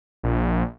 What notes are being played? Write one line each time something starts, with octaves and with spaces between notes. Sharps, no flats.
A#1